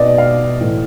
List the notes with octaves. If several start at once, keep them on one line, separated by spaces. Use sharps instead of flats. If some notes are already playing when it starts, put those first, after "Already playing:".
Already playing: B2 D5 D#5
F5
A2 E3